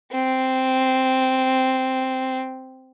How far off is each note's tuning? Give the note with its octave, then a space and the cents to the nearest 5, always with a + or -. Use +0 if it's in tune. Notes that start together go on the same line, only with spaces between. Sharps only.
C4 -5